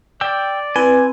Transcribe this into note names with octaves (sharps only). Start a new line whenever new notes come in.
D5 G5 E6
C4 E4 B4 G#5